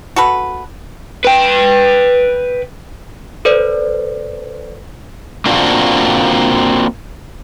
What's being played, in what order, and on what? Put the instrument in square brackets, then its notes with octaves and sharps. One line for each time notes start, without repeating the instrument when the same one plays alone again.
[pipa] F#4 A4 B4
[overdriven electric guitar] B4 G5
[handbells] A4 B4 C5 D5
[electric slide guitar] A#3 C4 D4 F4 F#4